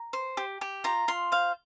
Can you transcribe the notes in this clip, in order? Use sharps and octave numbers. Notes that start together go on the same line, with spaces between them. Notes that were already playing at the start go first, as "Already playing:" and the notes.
Already playing: A#5
C5
G4
G4
F4 A#5
F4 C6
C5 F5